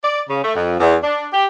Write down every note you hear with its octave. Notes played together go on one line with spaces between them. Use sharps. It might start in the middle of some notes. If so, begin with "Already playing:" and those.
D5
C#3
A3
F2
E2
D4
G4